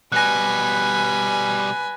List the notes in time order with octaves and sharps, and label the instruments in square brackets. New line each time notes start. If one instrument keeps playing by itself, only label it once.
[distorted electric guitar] B2 G3 [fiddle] B4 G#5 [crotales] F#6 A#6